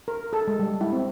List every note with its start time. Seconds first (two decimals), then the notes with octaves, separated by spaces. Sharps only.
0.08 A#4
0.33 A4
0.48 G#3
0.59 G3
0.81 E4
0.93 C4